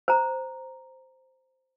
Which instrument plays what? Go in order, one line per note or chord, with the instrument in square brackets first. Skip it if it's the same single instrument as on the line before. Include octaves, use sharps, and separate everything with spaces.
[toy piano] C5 A#5